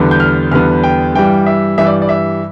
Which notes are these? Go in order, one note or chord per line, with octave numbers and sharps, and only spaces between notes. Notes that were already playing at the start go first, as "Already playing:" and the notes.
Already playing: E2 D3 G3 B3
G6
F6
E2 D3 G3 B3 F6
G5
G2 E3 G3 G5
E5
G2 E3 G3 E5
D5
D5
E5